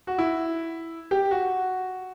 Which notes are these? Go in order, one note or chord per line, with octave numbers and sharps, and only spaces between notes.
F#4
E4
G4
F#4